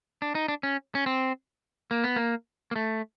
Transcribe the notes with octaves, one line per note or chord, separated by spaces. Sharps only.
D4
D#4
D4
C#4
C#4
C4
A#3
B3
A#3
A#3
A3